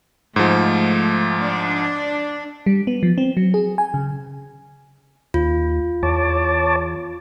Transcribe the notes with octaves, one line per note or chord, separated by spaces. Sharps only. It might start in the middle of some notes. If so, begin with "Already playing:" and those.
G#2 F3 A3
D4
G3
B3
F3
C4
F#3
G#4
G#5
C#3
D#2 F4
E2 C#5 A5 D6